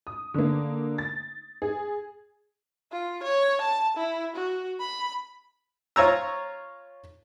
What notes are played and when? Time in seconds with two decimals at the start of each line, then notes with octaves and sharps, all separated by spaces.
0.07 D#6
0.34 D3 A#3
0.98 A6
1.62 G#4
2.92 F4
3.23 C#5
3.61 A5
3.97 E4
4.36 F#4
4.80 B5
5.96 F4 C#5 A#5 E6